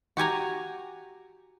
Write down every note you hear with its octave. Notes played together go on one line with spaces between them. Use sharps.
F#4 G4 G#5 A#5